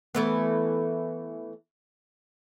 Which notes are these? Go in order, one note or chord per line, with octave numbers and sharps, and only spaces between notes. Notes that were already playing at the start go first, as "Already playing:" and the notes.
E3 A3 B3